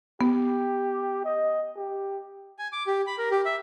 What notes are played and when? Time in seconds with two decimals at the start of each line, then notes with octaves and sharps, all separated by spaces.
0.21 B3 G4
1.25 D#5
1.76 G4
2.59 G#5
2.73 D6
2.87 G4
3.07 B5
3.18 A#4
3.31 G4
3.45 E5